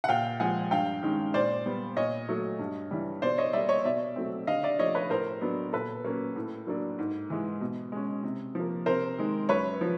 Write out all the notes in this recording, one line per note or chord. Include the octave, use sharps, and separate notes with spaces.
F#5
A#2 F5 G5
F3 G#3 F#5 G#5
G2 F5 G5
D#3 G#3 C#4
A#2 C5 D5
G3 B3
A#2 C#5 D#5
F#3 A3
G2
E3 G3
B2 C5 D5
C#5 D#5
G3 A#3 D5 E5
C#5 D#5
B2 D5 E5
F#3 A3 C4
D3 D#5 F5
D5 E5
F3 A3 C#5 D#5
B4 C#5
A2 A#4 C5
F#3 B3 D4
A#2 A4 B4
F#3 A#3 C#4
A2
F#3 A#3 D4
G#2
E3 G#3
B2
G#3 C#4
C3
F3 A#3
C3 A#4 C5
D#3 G#3
F#2 B4 C#5
F3